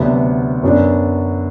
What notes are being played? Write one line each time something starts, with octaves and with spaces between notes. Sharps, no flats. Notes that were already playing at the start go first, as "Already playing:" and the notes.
Already playing: D2 C3 F#3 B3 D4
F#2 F#3 B3 D4